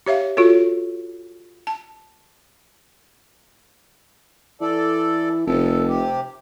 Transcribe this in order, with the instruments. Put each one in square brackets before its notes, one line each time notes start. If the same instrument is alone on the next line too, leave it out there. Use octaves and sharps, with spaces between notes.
[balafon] G4 C#5 E5 F5
F4 F#4 A4 C#5
A5
[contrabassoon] E3 [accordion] A4 D5
[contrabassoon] F1 [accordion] F3 A4
[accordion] C3 G4